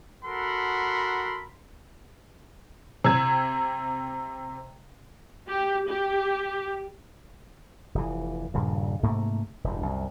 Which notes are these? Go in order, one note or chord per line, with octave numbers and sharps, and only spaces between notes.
F#4 A4 A#4 F#5 B5 C6
C3 E6 G#6
G4
G4
F1 E3
D#1 G2 C#3
G#2 C3 A3 A#3
E1 G2
C2 F#2